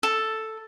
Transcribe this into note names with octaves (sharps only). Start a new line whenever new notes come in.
A4